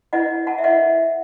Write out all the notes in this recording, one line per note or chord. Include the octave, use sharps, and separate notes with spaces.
E4 B4 D#5 F#5
F#5 A5
E5
E4 B4 D#5 F#5